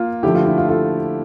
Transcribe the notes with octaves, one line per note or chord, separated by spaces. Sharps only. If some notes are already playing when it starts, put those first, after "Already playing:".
Already playing: A#3 F4
D3 F3 A3 E4 G4
F4
E4
F4
F4 A4